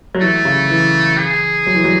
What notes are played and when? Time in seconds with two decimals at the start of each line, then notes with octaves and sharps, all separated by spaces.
0.15 F#3
0.21 E3 A3
0.45 C#3
0.70 E3
1.18 G#4
1.67 F#3
1.75 E3
1.84 F#3